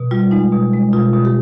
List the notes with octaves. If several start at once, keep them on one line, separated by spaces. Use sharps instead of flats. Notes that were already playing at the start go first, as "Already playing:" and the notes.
Already playing: B2
G3 F4
G#3 D#4
B2
G#3
B2 F4
B2
G4